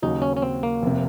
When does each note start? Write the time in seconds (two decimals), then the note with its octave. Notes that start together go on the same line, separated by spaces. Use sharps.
0.02 D#2 C#3 F#3 D#4
0.22 C#4
0.37 C#4
0.42 C4
0.63 A#3
0.82 F1 C3